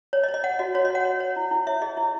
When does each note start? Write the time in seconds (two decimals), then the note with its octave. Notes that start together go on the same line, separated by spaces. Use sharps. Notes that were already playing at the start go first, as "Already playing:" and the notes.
0.13 C#5
0.24 D#5
0.29 C#5
0.34 D#5
0.44 C#5 F#5
0.59 F#4 D#5
0.75 F#4 C#5
0.85 D#5
0.90 C#5 F#5
1.05 C#5
1.20 C#5
1.36 E4
1.51 E4
1.67 C#5 E5
1.82 G#4 D#5
1.97 E4